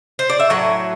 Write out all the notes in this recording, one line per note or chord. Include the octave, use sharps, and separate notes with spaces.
C5
D5
E5
A2 F#3 F#5